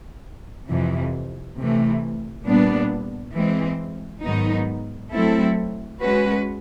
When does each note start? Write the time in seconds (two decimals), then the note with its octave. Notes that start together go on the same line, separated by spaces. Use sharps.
0.69 F2 C3 E3
1.57 C3 E3 A3
2.46 A#2 G3 B3 D4
3.34 E3 G#3 C4
4.23 G#2 D#3 F#3 B3 D#4
5.11 F#3 A3 C4 E4 A4
6.00 G#3 C#4 F#4 B4